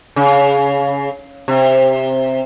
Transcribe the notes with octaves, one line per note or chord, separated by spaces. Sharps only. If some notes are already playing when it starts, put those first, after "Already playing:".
C#3
C3